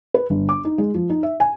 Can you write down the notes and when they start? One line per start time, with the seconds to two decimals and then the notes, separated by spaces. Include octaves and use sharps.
0.14 B4
0.30 G1
0.49 D6
0.65 D#4
0.78 G#3
0.94 F3
1.10 D#4
1.23 E5
1.40 G#5